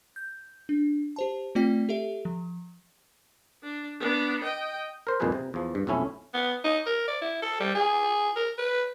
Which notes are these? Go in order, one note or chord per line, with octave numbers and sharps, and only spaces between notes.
G6
D4
G4 C5 A5
A3 C4 F4 D5 G5 B6
G4 A4 E5
F3
D4
B3 D4
D#5 G5
A#4 C5
C2 F2 A#2 D#4 G#4 B4
C3
E2 F3
G2
B1 F2 A3 C#4 E4
B3
D#4
A#4
D5
E4
A4
G3
G#4
A#4
B4